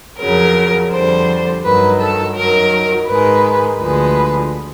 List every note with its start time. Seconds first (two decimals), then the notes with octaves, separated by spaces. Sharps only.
0.19 F2 C#3 F#3 A#4
0.91 F2 D3 G3 C5
1.64 G2 D#3 F#3 B4
2.00 A4
2.35 F#2 D#3 F#3 A#4
3.07 G#2 D#3 G#3 B4
3.79 D2 D3 F3 G#3 B4